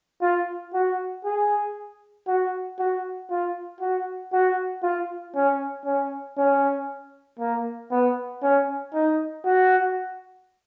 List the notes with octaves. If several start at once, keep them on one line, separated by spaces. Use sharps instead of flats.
F4
F#4
G#4
F#4
F#4
F4
F#4
F#4
F4
C#4
C#4
C#4
A#3
B3
C#4
D#4
F#4